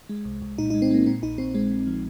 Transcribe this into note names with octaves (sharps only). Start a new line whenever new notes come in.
G#3
C2
C2
A#2 D#4
D#4
G#3
C4
G#3 A#3
A#2 C4
A#1 D#4
A#1 C4
G#3 C4
A#2
F3